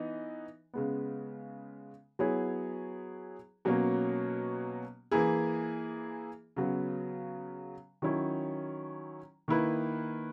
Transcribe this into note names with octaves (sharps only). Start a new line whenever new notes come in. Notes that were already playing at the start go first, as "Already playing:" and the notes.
Already playing: E3 B3 D#4
C#3 G#3 B3
F#3 B3 E4 G#4 C#5
B2 F#3 A#3 C#4
E3 A#3 E4 G#4
C#3 F#3 B3
D#3 F#3 C#4 E4
D#3 A#3 E4 B4